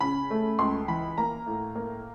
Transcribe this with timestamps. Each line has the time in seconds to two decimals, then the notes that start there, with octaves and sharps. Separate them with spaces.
0.01 C#3 B5
0.30 A3
0.59 C#2 C6
0.88 E3 B5
1.18 A#3 A#5
1.46 A2
1.75 A#3